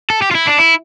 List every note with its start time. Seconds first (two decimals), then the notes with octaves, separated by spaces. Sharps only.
0.10 A4
0.22 G4
0.31 F4
0.35 E4
0.47 D4
0.59 E4